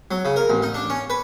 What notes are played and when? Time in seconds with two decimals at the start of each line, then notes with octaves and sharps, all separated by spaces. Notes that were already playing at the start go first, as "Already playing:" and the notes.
0.11 F#3
0.25 C#3
0.36 A#4
0.50 A1
0.62 D#4
0.74 D4
0.90 C#4
1.10 B4